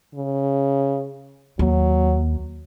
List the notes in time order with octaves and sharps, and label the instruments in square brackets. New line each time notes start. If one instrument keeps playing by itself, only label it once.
[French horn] C#3
[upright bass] D#2 [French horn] F#3